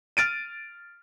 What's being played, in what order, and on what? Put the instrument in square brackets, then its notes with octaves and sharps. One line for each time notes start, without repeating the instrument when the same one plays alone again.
[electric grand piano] F6 A6 D7 D#7